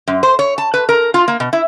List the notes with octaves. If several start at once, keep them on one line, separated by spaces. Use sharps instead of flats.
F#2
C5
C#5
A5
B4
A#4
F4
A#3
B2
E4